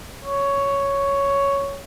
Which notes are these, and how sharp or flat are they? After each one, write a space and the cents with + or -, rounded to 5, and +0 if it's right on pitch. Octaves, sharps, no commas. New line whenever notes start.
C#5 +5